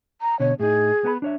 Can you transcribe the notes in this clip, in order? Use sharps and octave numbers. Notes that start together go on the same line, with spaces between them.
A#5
B2 D3 C#5
A2 D#4 G#4
B3 A4 B5
D4 C#5 E5